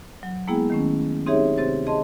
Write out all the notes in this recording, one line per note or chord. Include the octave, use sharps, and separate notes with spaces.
F#3
G#3 A#3 B3 E4 G#4 G5
D#3 A3 C#4
C4 D#4 G4 G#4 C#5 E5
C3 C4 G4 C5 A6
G#4 D#5 A5 C6